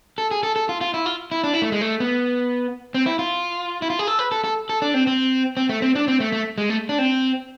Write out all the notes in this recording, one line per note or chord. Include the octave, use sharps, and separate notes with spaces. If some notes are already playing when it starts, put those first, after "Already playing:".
A4
G#4
A4
A4
F4
F4
E4
F4
E4
D4
E4
A3
G#3
A3
B3
C4
E4
F4
E4
F4
G#4
A4
B4
A4
A4
A4
D4
C4
C4
C4
A3
C4
D4
C4
A3
A3
G#3
A3
D4
C4